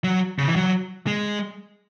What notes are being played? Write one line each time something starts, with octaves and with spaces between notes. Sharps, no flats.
F#3
C#3
E3
F#3
G#3